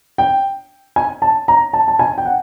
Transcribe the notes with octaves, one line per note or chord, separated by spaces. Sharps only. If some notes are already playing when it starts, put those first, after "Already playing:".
G5
G#5
A5
A#5
A5
A5
G#5
G5
F#5